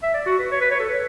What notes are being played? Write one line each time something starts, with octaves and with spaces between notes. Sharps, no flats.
E5
D5
F#4
B4
C#5
B4
C#5
A4
B4